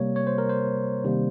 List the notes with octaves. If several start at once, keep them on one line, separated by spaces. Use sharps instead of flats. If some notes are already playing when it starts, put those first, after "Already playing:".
Already playing: C3 G3 A#3 C#5
C#5
C5
A#4
C5
C3 D#3 G3 A#3